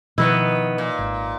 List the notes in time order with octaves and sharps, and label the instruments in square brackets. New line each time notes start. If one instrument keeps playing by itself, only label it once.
[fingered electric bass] B2 F3 [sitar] D#3 B3 [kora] E4 B4 D#5
[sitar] A#2
[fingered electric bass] G#1